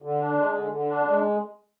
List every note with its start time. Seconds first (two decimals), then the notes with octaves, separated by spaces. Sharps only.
0.02 D3
0.20 D4
0.37 G#3
0.54 D3
0.71 D3
0.88 D4
1.05 G#3